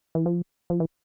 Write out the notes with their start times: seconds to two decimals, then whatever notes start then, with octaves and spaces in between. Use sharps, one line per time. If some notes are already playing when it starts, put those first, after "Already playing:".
0.15 E3
0.26 F3
0.70 F3
0.80 E3